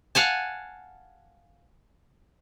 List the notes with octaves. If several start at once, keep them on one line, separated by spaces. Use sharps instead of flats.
F5 F#5 G#5 A5